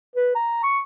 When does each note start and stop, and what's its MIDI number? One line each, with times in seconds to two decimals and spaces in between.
0.16 0.33 71
0.35 0.60 82
0.63 0.79 85